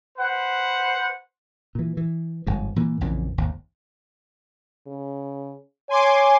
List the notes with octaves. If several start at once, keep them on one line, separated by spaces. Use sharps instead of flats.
B4 C5 F#5
A#2 E3
E3
G1 F2 G#2
A#2 E3 A#3
A#1 F2 C#3 E3
G#1 D#2
C#3
C#5 G#5 C6 D6